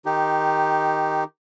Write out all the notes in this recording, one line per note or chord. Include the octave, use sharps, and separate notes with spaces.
D#3 D#4 G4